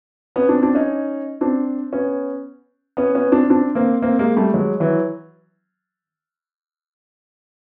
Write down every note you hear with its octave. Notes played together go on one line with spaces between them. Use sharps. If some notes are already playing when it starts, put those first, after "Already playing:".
B3 C#4
C4 D4
C4 D4
C#4 D#4
C4 D4
B3 C#4
B3 C#4
B3 C#4
C4 D4
C4 D4
A#3 C4
A#3 C4
G#3 A#3
G3 A3
F#3 G#3
E3 F#3